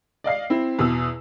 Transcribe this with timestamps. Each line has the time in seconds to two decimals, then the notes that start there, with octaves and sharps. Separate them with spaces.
0.24 D5 D#5 F5 C7
0.50 C4 E4
0.79 E2 B2 D#6 E6